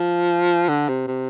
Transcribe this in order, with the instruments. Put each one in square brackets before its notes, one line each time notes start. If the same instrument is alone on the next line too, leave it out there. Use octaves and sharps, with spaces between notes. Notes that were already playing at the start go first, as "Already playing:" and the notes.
Already playing: [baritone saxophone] F3
D3
C3
C3